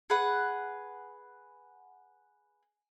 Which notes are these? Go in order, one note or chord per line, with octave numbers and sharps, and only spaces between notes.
G#4 B4 F#5